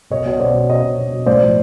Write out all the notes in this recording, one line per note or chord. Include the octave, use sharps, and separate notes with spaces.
B2 C#5 D#5
B2 D#5
B2 C5 D5
B2
B2 C#5 D#5
B2
B2
B2
A2 C5 D5
F3